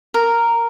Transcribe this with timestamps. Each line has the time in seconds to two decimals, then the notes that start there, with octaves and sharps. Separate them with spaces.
0.14 A#4